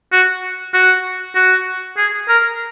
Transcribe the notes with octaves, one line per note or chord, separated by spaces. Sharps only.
F#4
F#4
F#4
G#4
A#4